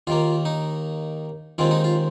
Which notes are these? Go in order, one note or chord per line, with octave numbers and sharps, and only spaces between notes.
D#2 D#3 A#3 F4
D#4
D#2 D#3 G#3 C4 F4
D#4
F4